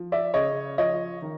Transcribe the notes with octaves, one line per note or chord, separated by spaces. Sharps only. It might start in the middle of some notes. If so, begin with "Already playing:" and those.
Already playing: F3
D5 E5
C#3 C#5 D#5
F3 C#5 D#5
D#3